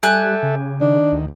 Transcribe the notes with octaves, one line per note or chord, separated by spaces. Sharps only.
G3 G4 A4 E5 G#5 F#6
C#3
D#3 D4
D2